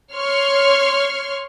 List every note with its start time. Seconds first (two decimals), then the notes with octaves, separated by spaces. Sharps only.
0.15 C#5 C6 F6